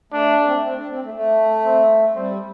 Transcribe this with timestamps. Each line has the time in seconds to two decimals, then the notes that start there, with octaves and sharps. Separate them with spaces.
0.12 A3 D4
0.38 A3
0.46 C4
0.52 A3
0.63 C4
0.76 D4
0.89 C4
1.02 A3
1.14 A3
1.65 C4
2.15 G3 C4